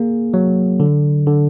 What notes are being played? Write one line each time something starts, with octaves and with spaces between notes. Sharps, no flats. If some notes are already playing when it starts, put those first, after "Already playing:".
Already playing: A#3 G#4
F#3
D3
D3